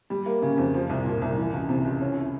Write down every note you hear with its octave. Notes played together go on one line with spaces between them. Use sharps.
G3
A#3
C#3
F2
F3
C2
A#2
C2
E3
C#2
C3
C#2
C#4
E4